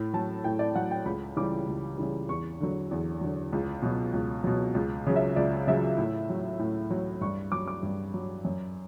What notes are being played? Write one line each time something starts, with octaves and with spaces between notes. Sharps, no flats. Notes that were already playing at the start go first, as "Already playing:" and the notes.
Already playing: A2
F#3 A5
A2 G5
D5
F#3 F#5
G5
C#2 B5
C#3 E3 G3 D6
C#2
C#3 E3 G3
E2 C#6
D3 F#3
E2
D3 F#3
C#2
B2 F#3
C#2
B2 F#3
C#2
C#3 F#3
E5
C#2 D5
C#3 F#3 E5
A2
F#3
A2
F#3
G2 C#6
F#3 D6
D6
G2
F#3
F#2